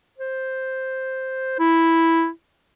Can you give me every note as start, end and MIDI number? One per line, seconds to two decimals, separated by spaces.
0.18 1.57 72
1.59 2.28 64